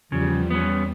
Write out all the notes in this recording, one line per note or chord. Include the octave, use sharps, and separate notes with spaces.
E2 C#3 F3 G3
B3 C#4